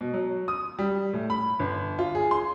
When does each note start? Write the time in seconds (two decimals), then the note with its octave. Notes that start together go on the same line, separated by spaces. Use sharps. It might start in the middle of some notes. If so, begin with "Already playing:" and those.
0.01 B2
0.14 F#3
0.48 D#6
0.79 G3
1.13 A2
1.30 B5
1.59 G1
1.99 F4
2.15 G#4
2.31 C6